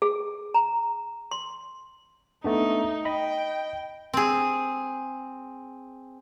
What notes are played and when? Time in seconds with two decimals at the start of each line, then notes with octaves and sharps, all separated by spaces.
0.02 G#4
0.54 A#5
1.31 C6
2.44 A3 B3 D4 D#4
3.05 D#5 G5 B5
4.13 C4 G#4